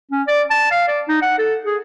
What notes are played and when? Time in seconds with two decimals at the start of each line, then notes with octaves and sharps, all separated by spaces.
0.11 C#4
0.27 D5
0.50 A5
0.71 F5
0.88 D5
1.08 D#4
1.22 F#5
1.39 A4
1.65 G#4